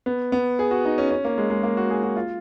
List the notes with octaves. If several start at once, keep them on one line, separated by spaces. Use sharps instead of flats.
B3
B3
G#4
F#4
D#4
C#4
C#4
A#3
G#3
G#3
A#3
F#4
G#4
F#4
F4